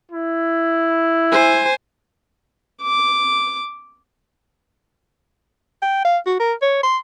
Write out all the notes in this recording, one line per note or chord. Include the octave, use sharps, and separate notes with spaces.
E4
C5 G#5
D6
G5
F5
F#4
A#4
C#5
C6